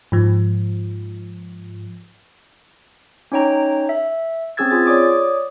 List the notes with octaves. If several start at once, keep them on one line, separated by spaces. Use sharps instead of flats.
G#2 F3
C#4 D#4 C#5 G5 A#5
E5
C4 C#4 G#4 E6 G#6 A6
F4 G#4 A6
C#5 D5 D6 D#6